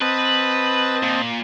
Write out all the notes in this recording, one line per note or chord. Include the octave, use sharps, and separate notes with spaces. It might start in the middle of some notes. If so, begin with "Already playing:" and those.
C4 B4 D#5 A5
A#2